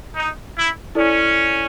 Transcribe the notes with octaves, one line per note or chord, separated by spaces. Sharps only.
D#4
E4
C#4 E4 A4 D5